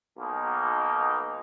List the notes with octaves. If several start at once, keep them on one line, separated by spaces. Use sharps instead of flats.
B1 B2 A#3 D#4